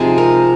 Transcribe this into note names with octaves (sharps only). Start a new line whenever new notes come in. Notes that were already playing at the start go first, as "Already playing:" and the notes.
Already playing: C3 F3 G#3 D#4 G#4
A#4